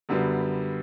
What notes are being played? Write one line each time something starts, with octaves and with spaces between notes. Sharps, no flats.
F#2 D3 G3 B3